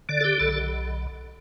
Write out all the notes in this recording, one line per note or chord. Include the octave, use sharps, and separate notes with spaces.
D3 D5
A4
G4
B1 A4